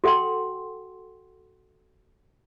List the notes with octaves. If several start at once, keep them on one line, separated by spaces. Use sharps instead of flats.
F#4 A4 F#5 G5 C6